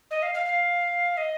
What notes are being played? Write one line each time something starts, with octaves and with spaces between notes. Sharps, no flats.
D#5
F5
F5
F5
D#5